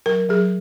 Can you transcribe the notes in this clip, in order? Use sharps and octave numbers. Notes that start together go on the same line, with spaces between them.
F#3 A#4
F#3 G#4